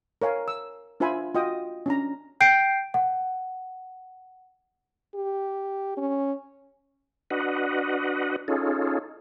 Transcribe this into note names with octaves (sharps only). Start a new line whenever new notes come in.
A#4 C#5 F5 G#5
E6
D4 F4 C5 E5 G#5 B5
F4 F#4 D#5 G5 D#6
C#4 D4 A#5
G5 G6 C7 D7
F#5
G4
C#4
D4 F#4 B4 D#5 F#5
C#4 D#4 F4 G#4 A4